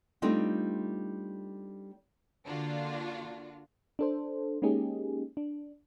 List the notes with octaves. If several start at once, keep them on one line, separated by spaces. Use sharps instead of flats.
G3 A3 C4 D4 D#4 F4
D3 A#3 D4 F4 F#4
D4 A4 C5
G#3 A#3 C#4 D#4 G4 G#4
D4